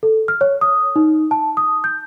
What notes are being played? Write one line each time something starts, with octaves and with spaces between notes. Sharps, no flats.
A4
F6
C#5
D#6
D#4
A5
D#6
G6